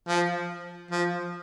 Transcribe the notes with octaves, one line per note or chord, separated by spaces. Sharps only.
F3
F3